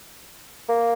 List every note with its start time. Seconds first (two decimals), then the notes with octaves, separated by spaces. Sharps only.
0.69 A#3